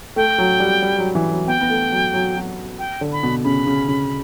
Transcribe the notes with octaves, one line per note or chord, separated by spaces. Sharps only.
A3 G5
F#3
G3
G3
F#3
E3
F#3
B3 G5
B3
A3
F#3
F#3
F#3
G5
D3
B5
B2
C#3 B5
C#3
C#3